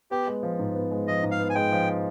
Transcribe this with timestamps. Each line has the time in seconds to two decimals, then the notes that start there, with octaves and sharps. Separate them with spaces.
0.11 B3 G4
0.27 G#3
0.43 F3
0.59 G#2
0.75 B3
0.91 G#3
1.07 F3 D#5
1.23 G#2
1.31 F5
1.39 B3
1.50 G#5
1.55 G#3 G5
1.72 F3